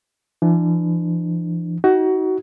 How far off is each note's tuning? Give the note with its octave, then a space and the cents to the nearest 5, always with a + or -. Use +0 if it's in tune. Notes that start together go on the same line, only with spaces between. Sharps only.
E3 +45 D4 +40
D#4 +35 F#4 +20